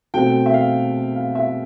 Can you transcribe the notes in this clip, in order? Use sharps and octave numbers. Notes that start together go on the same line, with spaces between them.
B2 A3 C4 G5
E5
F5
F5
E5